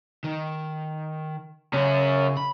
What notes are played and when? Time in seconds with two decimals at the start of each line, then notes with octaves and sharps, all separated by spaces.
0.24 D#3
1.73 F#2 C#3 C#4
2.37 B5